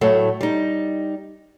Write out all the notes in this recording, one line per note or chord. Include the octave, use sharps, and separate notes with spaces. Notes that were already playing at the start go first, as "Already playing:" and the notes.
A2 F#3 A3
G3 D#4